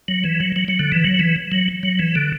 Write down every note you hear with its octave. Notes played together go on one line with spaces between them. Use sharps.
F#3
E3
F#3
F#3
F#3
D3
E3
F#3
E3
F#3
F#3
E3
D3